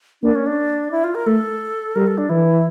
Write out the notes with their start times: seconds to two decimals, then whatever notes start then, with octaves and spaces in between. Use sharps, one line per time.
0.22 A#3 D4
0.35 C#4
0.47 D4
0.91 E4
1.04 F4
1.15 A#4
1.27 A3 A4
1.96 G3 A#4
2.07 A4
2.18 D4
2.29 E3 E4